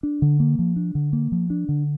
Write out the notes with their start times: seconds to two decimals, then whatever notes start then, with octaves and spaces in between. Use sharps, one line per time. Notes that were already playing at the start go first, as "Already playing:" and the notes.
0.03 D4
0.22 D3
0.40 A#3
0.59 F3
0.76 D4
0.95 D3
1.13 A#3
1.32 F3
1.50 D4
1.69 D3